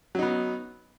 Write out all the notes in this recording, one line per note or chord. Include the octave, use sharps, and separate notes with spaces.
F#3 B3 D#4